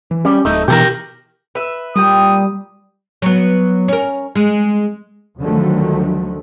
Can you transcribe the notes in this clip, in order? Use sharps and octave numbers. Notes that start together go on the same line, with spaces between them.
E3
G3 C#4
D1 A3 D#4
B2 E3 G4 A4 A#4
B4 E5
A#2 G3 G5 D#6
F#3 B3
C#4 A#4
G#3
D2 D3 D#3 F3 F#3 A3